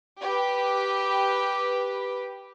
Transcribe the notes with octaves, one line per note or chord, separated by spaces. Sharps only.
G4 B4